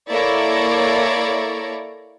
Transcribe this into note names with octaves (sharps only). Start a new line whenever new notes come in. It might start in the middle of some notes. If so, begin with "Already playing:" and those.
A#3 E4 A4 C#5 D5 A#5